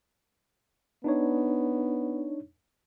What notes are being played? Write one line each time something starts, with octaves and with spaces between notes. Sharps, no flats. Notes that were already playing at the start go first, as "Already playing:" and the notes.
B3 D4 D#4 C#5